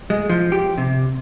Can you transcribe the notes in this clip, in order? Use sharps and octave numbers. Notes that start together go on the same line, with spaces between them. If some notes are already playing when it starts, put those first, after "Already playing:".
G#3
F3
G4
C3